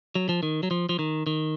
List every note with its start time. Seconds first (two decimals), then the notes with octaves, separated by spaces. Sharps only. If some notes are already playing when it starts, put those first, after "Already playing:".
0.15 F#3
0.29 F3
0.43 D#3
0.63 F#3
0.71 F3
0.89 F3
0.99 D#3
1.27 D#3